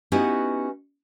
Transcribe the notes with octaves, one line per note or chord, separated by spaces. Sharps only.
B3 C#4 D#4 E4 F#4 G4